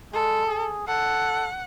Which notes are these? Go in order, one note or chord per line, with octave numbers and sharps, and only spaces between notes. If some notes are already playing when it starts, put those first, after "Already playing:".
G#3 A4
G#4
A4 F#5